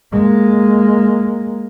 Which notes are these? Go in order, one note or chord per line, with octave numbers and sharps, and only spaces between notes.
G#3 A#3